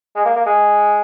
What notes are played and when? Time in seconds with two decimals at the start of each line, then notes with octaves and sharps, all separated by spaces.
0.16 G#3
0.25 A#3
0.36 A#3
0.46 G#3